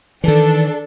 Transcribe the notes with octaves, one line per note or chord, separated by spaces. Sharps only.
D#3 E3 D4 A4